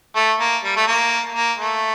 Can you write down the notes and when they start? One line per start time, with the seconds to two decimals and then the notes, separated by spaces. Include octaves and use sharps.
0.16 A3
0.40 A#3
0.64 G3
0.76 A3
0.87 A#3
1.35 A#3
1.58 A3